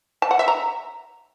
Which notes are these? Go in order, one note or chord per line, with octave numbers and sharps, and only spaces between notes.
A5
F#5
E5
A#5